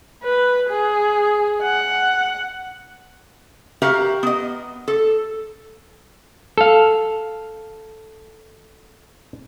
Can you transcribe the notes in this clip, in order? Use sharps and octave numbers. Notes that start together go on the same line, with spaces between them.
B4
G#4
F#5
F#4 G4 A#4 E5 F5 A#5
B3 D#5
A4
A4 F5